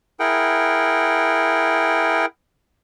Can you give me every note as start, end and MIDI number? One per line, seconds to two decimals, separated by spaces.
0.20 2.25 64
0.20 2.25 68
0.20 2.25 70
0.20 2.25 78
0.20 2.25 79